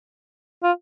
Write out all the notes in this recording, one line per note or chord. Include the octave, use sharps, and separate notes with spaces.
F4